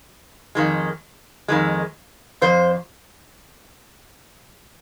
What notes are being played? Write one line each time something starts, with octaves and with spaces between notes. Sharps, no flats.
F2 D#3 G#3
F2 D#3 G#3
F2 F3 C5